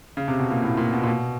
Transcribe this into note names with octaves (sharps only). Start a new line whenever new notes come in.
C#3
C3
B2
A#2
A2
A#2
B2
A#2
B2